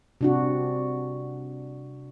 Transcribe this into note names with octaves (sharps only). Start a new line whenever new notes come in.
C3 D4 F#4